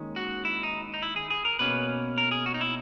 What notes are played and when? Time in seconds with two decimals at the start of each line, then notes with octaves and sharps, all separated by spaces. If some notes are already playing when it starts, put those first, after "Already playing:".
Already playing: D#2 D#3 G#3 C#4
0.16 F#4
0.45 E4
0.63 D#4
0.94 D#4
1.02 E4
1.16 G#4
1.30 G#4
1.45 A#4
1.59 B2 A#3 C#4 B4
2.18 A#4
2.31 G#4
2.46 F#4
2.54 D#4
2.61 E4